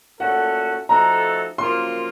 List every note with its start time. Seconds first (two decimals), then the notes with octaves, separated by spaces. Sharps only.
0.20 A#2 A3 C#4 F#4 A4 F#5
0.89 F3 A3 D#4 F#4 A4 A#5
1.58 F#2 C#3 F3 A#3 F4 C6